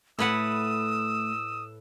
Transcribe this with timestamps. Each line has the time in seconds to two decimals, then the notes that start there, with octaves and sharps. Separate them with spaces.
0.19 A2 A3 B4 F#5 D#6 E6